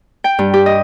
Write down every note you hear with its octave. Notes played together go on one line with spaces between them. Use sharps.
G5
G2
G4
D#5